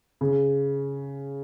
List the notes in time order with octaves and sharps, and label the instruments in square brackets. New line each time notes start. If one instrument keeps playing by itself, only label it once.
[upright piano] C#3